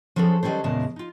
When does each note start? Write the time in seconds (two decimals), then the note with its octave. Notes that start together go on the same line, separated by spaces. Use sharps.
0.16 F3 F#3 C#4 G#4 A4 C5
0.43 D#3 F#3 G3 C#4 A4 C5
0.64 E2 A#2 C#3 G#3 A#4 A5
0.96 D#4 F4